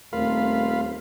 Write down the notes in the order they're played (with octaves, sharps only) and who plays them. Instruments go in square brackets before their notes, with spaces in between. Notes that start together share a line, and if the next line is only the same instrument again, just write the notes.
[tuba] D#1 [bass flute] A3 [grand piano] C4 A#4 [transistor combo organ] F4 F5 B5